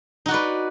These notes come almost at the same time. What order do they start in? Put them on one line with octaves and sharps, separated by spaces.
D#4 F#4 D5 B4